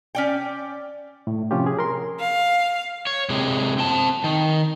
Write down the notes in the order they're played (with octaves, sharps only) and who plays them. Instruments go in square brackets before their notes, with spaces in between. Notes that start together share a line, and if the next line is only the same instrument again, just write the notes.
[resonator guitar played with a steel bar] C#4 D5 G5
[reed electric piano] A2
C3 F3 C#4 F4 G4
G#4
A#4 C6
[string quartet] F5
[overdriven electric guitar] C#5
C3 G#3
C4 A5
D#3